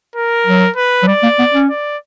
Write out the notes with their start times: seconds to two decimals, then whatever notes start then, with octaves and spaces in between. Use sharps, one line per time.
0.16 A#4
0.46 F#3
0.76 B4
1.03 F#3
1.07 G3 D5
1.23 A#3
1.39 B3
1.54 C#4
1.70 D5